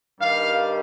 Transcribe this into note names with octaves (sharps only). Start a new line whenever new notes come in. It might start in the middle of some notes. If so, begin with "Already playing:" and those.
G2 D#3 G3 F5